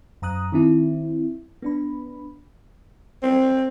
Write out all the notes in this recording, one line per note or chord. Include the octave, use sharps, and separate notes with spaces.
F#2 A#5 D#6 F#6
D#3 C4 E4
B3 D4 B5
C4